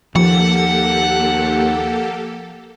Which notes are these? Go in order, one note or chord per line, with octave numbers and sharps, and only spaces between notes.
D#2 F3 A#3 G4 A4 F#5